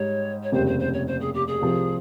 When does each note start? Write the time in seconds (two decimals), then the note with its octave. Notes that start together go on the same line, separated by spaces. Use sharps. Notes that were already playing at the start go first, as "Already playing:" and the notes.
Already playing: G#2 G3 C#5
0.43 C#5
0.52 F1 D#2 C#3 G3 C4 C5
0.66 C5
0.79 C5
0.93 C#5
1.07 C5
1.20 G#4
1.34 G4
1.47 G#4
1.61 C2 C3 F3